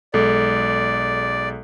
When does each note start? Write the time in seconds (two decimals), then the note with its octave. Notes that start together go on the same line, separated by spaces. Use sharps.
0.14 B1 G#3 A4 D5